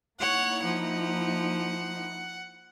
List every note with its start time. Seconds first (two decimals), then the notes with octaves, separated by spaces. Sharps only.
0.20 A#3 D#4 E4 C#5 F#5
0.63 F3 F#5